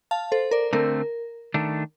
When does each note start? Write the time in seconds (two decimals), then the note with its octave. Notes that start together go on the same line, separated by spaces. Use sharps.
0.11 F5 A5
0.32 A4 C5
0.51 A#4 D5
0.73 D3 A3 C4 A#4
1.54 D#3 A3 D4